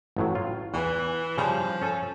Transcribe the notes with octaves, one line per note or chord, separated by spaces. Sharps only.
A1 A2 F#3
F4
E2 E3
C#3 F3 G3
C#4 A4 G#5